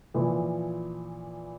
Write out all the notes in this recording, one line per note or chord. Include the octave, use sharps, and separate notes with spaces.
A#2 E3 F3